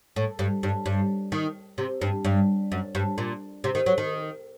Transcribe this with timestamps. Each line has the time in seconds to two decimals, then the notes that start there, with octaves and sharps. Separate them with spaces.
0.16 A2
0.39 G2
0.63 G2
0.86 G2
1.32 D#3
1.78 C3
2.02 G2
2.25 G2
2.72 F#2
2.95 G2
3.18 A#2
3.64 C3
3.75 D#3
3.86 F#3
3.98 D#3